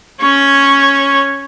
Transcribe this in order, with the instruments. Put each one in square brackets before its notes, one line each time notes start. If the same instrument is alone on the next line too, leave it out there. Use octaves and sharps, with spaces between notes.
[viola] C#4 C#5